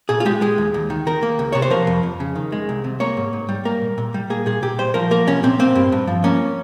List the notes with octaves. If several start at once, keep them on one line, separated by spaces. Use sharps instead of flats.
A#2 G#4
F4
G#3 G4
G#3 G#4
D#2
D#2
D#3
D#3 A#4
A#3
C#2
C3 C#5
C5
F3 A#4
F2
F2
C#3
D#3
G#3
C2
C3
A#3 C#5
G#2
G#2
G3
A#3 A#4
A#2
A#2
G3
A#3 G#4
A#2 G#4
A#2 G4
G3 C5
F3 A#4
A#3 A#4
C2 C#4
A#2 C4
A#3 C4
G2
G2
F3
A#3 C#4